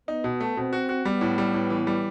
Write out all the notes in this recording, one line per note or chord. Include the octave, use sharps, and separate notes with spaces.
B3 D#4
B2
A3
B2 C4
F#4
F#4
G3 B3
A2
G3
A2
E3
G3